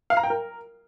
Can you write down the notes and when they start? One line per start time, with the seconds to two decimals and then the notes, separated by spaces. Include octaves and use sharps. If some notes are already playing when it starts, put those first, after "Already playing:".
0.10 F5
0.17 A#5
0.23 G5
0.30 A#4